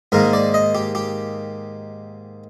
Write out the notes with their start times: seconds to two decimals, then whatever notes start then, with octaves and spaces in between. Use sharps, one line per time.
0.12 G#2 D#3 A#3 A#4
0.33 D5
0.54 D#5
0.75 G4
0.95 G4